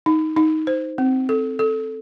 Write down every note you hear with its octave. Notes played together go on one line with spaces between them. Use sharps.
D#4
D#4
C5
C4
A4
A4